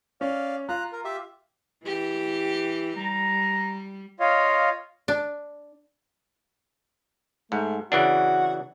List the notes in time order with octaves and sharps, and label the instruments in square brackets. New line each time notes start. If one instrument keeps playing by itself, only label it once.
[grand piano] C#4 [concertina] D5 F5
[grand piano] F4 [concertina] A#5 F#6
[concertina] A#4
G4 E5
[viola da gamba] E3 G4
[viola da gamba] G3 [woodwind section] A#5
[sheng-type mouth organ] F4 C#5 D#5 F5
[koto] D4
[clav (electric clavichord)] G#2 [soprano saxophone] A3
[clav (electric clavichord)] C#3 E3 D4 [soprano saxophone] F#4